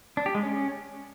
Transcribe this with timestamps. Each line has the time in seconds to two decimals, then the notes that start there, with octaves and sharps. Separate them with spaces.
0.17 D4
0.26 G4
0.35 G#3
0.43 C#4